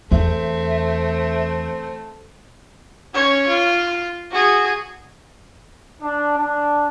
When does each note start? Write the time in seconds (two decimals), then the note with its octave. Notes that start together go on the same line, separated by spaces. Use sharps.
0.11 E2 A3 C4 E5
3.14 C#4 C#5
3.47 F4
4.31 F#4 G#4
6.01 D4
6.37 D4